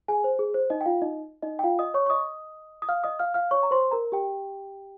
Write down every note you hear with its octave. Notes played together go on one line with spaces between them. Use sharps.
G#4 G#5
C5
G#4
C5
D#4 D#5
G5
F4 F5
D#4 D#5
D#4 D#5
G5
F4 F5
D#5 D#6
C#5 C#6
C#6
D#5 D#6
D#6
F5 F6
D#5 D#6
F5 F6
F5 F6
C#5 C#6
A#5
C5 C6
A#4 A#5
G4 G5